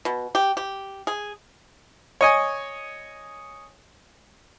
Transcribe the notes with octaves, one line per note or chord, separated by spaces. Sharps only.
B2
G4
G4
G#4
C#5 D#5 G#5